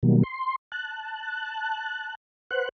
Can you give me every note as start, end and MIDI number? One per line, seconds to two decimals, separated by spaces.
0.03 0.23 47
0.03 0.23 51
0.03 0.23 54
0.03 0.23 55
0.03 0.23 58
0.23 0.56 84
0.72 2.15 81
0.72 2.15 90
2.51 2.69 71
2.51 2.69 72
2.51 2.69 78
2.51 2.69 90